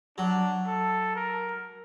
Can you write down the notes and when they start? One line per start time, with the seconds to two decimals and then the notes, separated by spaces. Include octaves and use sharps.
0.18 F#3 D4
0.66 A4
1.16 A#4